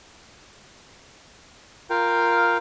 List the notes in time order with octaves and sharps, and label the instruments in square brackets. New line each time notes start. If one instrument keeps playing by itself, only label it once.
[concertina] F4 A#4 F5 G5